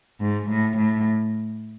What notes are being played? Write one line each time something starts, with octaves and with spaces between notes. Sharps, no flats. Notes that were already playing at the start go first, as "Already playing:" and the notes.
G#2
A2
A2